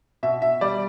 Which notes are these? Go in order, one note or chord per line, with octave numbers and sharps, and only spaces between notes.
B2 E5
E5
G3 D5